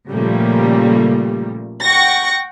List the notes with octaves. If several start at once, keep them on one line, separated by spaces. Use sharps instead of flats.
A#2 C#3 F3 G3 A3 A#3
F#5 G5 C#6 A#6